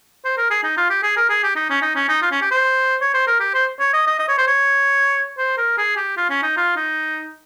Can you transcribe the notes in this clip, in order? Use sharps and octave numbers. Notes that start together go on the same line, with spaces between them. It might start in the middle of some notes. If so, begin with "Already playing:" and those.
C5
A#4
G#4
D#4
F4
G4
G#4
A#4
G#4
G4
D#4
C#4
D#4
C#4
D#4
F4
C#4
G4
C5
C#5
C5
A#4
G4
C5
C#5
D#5
D#5
D#5
C#5
C5
C#5
C5
A#4
G#4
G4
F4
C#4
D#4
F4
D#4